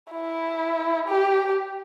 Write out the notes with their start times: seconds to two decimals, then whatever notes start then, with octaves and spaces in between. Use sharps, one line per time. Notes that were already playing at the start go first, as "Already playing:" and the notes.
0.12 E4
1.08 G4